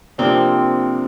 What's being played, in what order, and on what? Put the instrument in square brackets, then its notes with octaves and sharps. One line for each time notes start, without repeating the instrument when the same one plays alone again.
[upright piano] C3 F3 A#3 D4 [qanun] C4